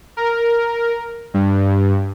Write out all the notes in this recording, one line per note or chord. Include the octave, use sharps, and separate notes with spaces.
A#4
G2